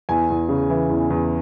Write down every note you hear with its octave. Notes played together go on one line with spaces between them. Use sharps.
E2 G#5
E2
C#3
E3
E2
E2